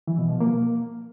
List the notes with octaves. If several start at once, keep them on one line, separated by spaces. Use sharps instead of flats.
E3
B2
F3
A#3